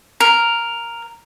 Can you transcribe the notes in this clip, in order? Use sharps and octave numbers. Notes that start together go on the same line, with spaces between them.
A#4